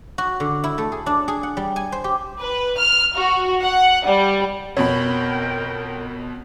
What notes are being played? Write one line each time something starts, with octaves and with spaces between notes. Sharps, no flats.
F#4
D3
E4
A3
G#4
D4
G#4
F#5
G3
G#5
C5
G4
B4
F6
F#4
F#5
G3
F2 B2 A#4 C#5 G5 B5